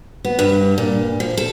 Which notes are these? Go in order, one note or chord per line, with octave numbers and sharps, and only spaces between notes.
B3
G2
A#2
F3
A4